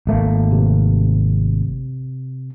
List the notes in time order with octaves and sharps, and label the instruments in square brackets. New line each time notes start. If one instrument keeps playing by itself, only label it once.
[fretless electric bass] G#1 A3 A#3
[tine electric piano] C3